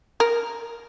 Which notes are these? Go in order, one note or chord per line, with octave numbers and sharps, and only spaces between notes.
A#4